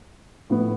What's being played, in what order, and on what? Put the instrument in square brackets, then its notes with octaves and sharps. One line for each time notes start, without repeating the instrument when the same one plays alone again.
[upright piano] A2 F3 B3